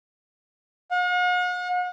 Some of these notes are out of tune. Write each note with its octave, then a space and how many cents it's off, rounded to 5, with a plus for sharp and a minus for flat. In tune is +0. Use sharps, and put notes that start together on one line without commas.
F#5 -45